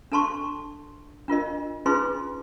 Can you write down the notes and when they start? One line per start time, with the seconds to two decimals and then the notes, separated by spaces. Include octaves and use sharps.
0.12 D4 A4 A5 C6 C#6
1.28 D4 F4 A#4 D#5
1.86 C#4 D#4 F4 G#4 B4 C6